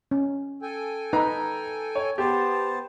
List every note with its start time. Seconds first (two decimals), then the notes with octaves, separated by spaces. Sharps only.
0.11 C#4
0.62 A4 G5 G#5
1.13 D#4 B4 A#5
1.95 C#5
2.18 B3 G4 C5 A5